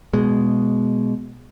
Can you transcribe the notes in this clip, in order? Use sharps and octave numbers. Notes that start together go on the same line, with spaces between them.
B2 G#3